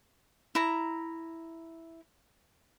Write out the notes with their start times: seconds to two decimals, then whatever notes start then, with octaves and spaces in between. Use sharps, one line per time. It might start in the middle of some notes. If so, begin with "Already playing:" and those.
0.55 E4 A#5